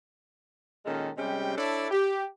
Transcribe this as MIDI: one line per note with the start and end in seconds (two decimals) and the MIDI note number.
0.86 1.09 46
0.86 1.09 51
0.86 1.09 56
0.86 1.09 61
0.86 1.09 69
1.17 1.55 48
1.17 1.55 55
1.17 1.55 56
1.17 1.55 61
1.17 1.55 79
1.57 1.87 62
1.57 1.87 64
1.57 1.87 69
1.57 1.87 73
1.57 1.87 74
1.91 2.24 67